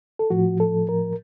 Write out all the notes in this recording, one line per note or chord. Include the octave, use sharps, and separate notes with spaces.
A4
A2 F3 F#4
A4
A#4